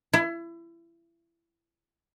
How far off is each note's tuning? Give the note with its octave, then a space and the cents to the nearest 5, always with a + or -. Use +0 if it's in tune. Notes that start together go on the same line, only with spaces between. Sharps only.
E4 +30